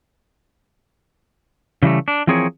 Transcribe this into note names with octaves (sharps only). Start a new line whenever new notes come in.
C#3 E3 G3 A3
D4
E3 F3 C4 G#4 A#4 C#5